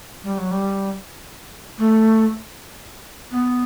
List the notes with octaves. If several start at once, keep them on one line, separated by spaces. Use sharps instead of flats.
G3
F#3
G3
A3
B3